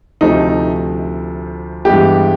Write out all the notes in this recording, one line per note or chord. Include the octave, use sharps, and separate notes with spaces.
D2 C3 F3 A3 D#4
G2 E3 G#3 B3 G4